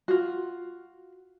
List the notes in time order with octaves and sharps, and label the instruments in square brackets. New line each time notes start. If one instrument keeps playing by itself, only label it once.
[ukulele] F4 F#4